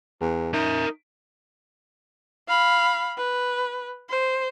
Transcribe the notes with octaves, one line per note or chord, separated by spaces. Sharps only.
E2
D#4 A#4 E5
F5 B5
B4
C5